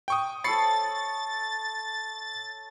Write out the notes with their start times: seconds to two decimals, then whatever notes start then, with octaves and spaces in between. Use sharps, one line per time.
0.08 G5 C#6 D#6
0.44 A4 C#5 B5 A6 C7 C#7